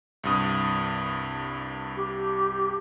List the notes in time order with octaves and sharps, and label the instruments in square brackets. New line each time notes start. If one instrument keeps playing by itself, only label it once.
[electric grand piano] C2 G2 D#6
[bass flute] G4